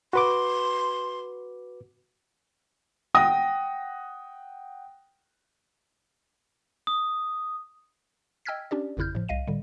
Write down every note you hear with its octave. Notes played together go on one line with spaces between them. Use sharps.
F#4 B4 C6 D6
F#5 G5 D#6 A#6
D#6
D#5 G5 E6 F6 G#6 B6
C#4 D4 G4 D5
G#1 F2 C#3 E4 F6 G6
A2 F3
C2 D#5 F5 D#7
A2 D3 G3